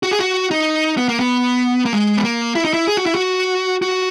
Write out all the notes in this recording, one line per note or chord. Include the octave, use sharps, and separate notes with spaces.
F#4
G#4
F#4
D#4
B3
A#3
B3
A#3
G#3
B3
A#3
E4
D#4
E4
G#4
F#4
E4
F#4
F#4